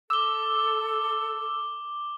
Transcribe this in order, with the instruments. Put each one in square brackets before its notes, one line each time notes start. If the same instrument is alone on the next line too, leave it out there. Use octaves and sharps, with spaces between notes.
[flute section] A4 [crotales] D6 G7 [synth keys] E6